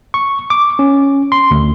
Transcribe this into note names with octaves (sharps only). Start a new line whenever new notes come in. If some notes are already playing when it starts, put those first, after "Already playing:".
C#6
D6
C#4
C6
D2